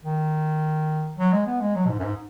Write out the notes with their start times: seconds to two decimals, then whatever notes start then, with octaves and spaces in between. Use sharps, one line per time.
0.05 D#3
1.18 F#3
1.32 G#3
1.47 B3
1.61 G#3
1.75 F#3
1.85 B2
1.89 G#2
1.99 F#2
2.04 G#2